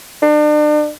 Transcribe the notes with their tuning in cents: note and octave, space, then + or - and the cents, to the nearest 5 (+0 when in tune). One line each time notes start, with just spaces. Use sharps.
D4 +40